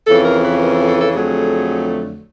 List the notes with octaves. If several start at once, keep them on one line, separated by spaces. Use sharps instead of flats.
F2 C#3 E3 A4
A#4
B4
A#4
A4
A4
A4
F2 D3 F#3 A3 G#4